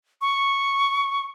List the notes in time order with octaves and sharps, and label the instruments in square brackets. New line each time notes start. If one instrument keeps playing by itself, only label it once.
[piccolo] C#6